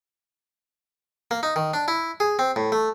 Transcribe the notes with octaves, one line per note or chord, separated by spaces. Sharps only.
A#3
D#4
D#3
D4
E4
G#4
C4
A2
A3